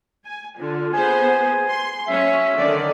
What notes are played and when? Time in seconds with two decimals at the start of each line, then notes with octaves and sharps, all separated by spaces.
0.23 G#5
0.58 D3 F4
0.93 B3 G#4 C5 G#5
1.67 C6
2.07 F#3 C#4 E5
2.56 D3 D#3 D5